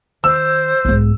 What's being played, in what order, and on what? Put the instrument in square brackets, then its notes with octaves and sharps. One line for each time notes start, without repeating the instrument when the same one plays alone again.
[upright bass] D#3 [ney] C5 [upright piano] E6
[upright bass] B1 G#2